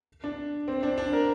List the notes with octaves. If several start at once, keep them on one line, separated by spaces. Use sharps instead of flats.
D4
C4
D4
D4
A#4